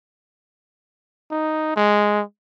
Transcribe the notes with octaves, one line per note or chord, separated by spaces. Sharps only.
D#4
G#3